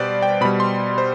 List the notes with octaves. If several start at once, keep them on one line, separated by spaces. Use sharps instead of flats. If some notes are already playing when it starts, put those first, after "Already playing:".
Already playing: B2 G3 B4 C5 D5
G5
B2 G3 B5
C6
C5